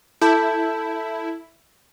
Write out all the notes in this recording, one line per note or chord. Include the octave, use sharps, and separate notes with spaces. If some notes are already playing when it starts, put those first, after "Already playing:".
E4 A4 A5 G6